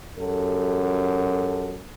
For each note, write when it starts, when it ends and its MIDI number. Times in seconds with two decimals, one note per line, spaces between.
0.19 1.85 42
0.19 1.75 66
0.19 1.75 67
0.19 1.75 69